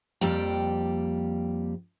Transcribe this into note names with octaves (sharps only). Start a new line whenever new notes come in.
F2 G3 A#3 G5